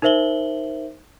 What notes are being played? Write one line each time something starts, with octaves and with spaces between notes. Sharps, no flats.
D#4 A#4 C5 E5 F#7 G7